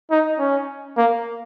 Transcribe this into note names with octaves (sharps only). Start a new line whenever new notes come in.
D#4
C#4
A#3